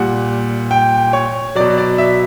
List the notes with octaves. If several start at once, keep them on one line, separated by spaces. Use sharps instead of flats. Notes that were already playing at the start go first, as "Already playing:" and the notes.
Already playing: A#2 G3 F#5
G5
C#5
B2 F#3 D5
D5
E5